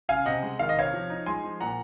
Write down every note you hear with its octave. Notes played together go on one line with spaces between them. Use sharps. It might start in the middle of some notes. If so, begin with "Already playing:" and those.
C#3 F5 G#5
C3 D#5 F#5
G#3
D#3 F5
D#5
C3 C#5 F5
F3
D#4
G#3 G#5 C6
F3
A#2 F#5 A#5